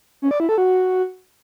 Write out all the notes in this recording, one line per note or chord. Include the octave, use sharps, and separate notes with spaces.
C#4
D5
E4
A4
F#4